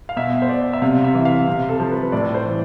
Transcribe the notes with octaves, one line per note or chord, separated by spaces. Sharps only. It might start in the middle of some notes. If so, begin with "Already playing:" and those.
F5
B2 E5
C5
D5
E5
C3 F5
E5
E3
F5
C3
A4
F3
B4
A2 D5
C5
E3